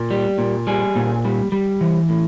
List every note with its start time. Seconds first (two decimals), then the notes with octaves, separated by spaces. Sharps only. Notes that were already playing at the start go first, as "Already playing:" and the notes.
Already playing: A#2
0.11 G3
0.38 A#2
0.67 G3 G#4
0.96 A#2
1.25 G3
1.52 G3
1.81 E3
2.09 A2